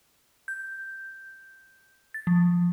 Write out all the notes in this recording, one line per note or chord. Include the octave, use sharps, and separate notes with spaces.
G6
A6
F3